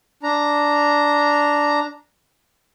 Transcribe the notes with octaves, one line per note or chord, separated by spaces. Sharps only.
D4 A#5